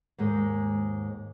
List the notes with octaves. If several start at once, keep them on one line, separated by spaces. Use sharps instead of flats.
D#2 G#2 G#3